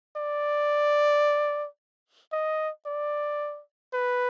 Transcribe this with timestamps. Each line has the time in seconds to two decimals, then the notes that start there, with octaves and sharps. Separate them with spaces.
0.16 D5
2.32 D#5
2.86 D5
3.94 B4